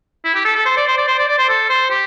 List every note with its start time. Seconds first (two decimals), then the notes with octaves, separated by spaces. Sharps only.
0.25 E4
0.35 G4
0.45 A4
0.56 A4
0.66 C5
0.77 D5
0.88 C5
0.97 D5
1.08 C5
1.18 D5
1.28 D5
1.39 C5
1.49 A4
1.70 C5
1.90 G4